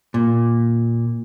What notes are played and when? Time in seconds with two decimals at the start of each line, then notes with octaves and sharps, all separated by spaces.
0.14 A#2